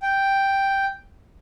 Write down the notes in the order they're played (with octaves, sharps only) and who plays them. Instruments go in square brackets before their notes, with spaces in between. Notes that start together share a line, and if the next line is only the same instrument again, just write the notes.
[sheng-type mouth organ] G5